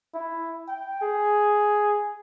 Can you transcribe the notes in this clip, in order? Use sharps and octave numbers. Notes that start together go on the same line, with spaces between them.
E4
G5
G#4